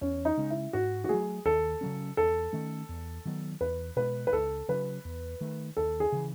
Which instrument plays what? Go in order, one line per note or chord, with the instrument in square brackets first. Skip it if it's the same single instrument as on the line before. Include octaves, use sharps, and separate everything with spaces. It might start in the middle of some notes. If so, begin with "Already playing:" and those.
[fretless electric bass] E2 [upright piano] C#4
[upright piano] D#4
[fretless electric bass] C#3 G#3 C#4
[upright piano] E4
[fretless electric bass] G#2 [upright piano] F#4
[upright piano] F#4
[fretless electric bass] F#3 A3 [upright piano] G#4
[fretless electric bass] D#2 [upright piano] A4
[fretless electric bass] C#3 F#3 C#4
[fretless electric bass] E2 [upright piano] A4
[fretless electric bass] D#3 A3 C#4
E2
D#3 F#3 B3
[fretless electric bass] E2 [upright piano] B4
[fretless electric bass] B2 G#3 [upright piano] B4
[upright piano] B4
[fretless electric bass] C#2 [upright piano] A4
[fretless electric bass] C#3 F#3 [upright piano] B4
[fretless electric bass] E2
D#3 A3
[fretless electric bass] D#2 [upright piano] A4
[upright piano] G#4
[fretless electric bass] C#3 E3